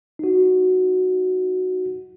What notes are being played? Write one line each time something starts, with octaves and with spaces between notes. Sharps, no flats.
D#4 F#4